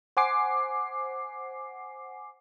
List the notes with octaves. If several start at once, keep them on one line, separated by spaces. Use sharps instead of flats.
C5 F#5 G#5 D6 C7